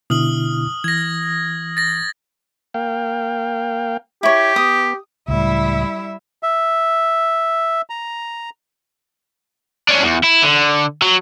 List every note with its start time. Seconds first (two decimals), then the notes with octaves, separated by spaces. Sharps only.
0.10 B2 D3 E4 D#6 F6 F#7
0.84 E3 G#6 A#6
1.77 A6 A#6
2.74 A#3 F5 G5
4.23 E4 G4 C#5
4.56 B3 D#6
5.28 C#2 A2 G3 E4 E5
6.43 E5
7.90 A#5
9.88 C#4 D4
10.03 E2
10.23 E4
10.42 D3
11.02 F#3